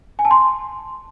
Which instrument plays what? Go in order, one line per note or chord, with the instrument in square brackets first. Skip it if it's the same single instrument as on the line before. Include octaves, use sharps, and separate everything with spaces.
[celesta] G#5
A5
C6